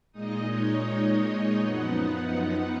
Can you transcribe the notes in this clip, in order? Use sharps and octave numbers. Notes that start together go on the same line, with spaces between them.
A#2 G#3 D#4 D#5
C#5
D#5
F#2 F3 B3 D#4 F#5